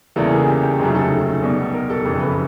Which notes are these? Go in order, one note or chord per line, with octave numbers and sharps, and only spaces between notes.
E2 C#3 E3 G3 A#3 A4
G#4
G4
G4
F1 D#2 C#3 F#3 A3 G#4
A4
B1 B2 G3
A#4
A4
F#1 F2 C#3 A4
B4